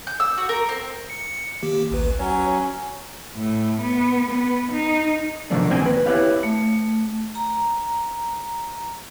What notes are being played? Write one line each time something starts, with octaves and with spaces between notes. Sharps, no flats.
G6
E6
F#4
A#4
C4
C#7
D#3 A#3 G4
A1 D2 B4
F#3 C#4 C#5
A2
B3
B3
D#4
C3 D#3 F3 A3 A#3 D4
D2 A#3 C4 G5 G#5
B4
C4 E4 G4 B4 C#5 F5
A3
A#5